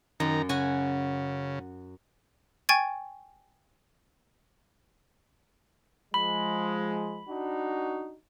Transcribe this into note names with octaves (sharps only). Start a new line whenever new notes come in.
F#2 D#3 A#5
C#3 F#4 G#5
G5 G#5 C#6 G#6 A6
F3 G#3 B5
D4 D#4 F#4